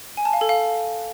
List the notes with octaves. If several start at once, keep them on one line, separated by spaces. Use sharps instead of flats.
G#5
A5
F5
A4
F5